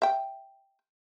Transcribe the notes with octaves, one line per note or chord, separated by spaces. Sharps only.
E5 G5